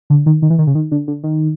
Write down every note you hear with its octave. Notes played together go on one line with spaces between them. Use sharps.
D3
D#3
D#3
E3
D#3
C#3
D#3
D3
D3
D#3